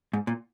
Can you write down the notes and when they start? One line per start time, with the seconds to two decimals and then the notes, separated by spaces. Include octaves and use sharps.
0.13 G#2
0.27 A#2